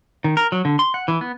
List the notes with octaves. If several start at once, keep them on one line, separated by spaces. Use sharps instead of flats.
D#3
A#4
F#3
D3
C6
F#5
E3
B3